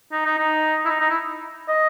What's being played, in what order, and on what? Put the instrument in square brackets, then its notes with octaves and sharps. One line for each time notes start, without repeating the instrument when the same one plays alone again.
[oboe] D#4
D#4
D#4
E4
D#4
D#4
E4
D#5